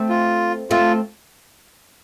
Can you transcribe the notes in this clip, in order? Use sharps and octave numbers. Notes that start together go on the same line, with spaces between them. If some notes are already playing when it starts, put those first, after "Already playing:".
Already playing: A3 C4
F4
A3 C4 F4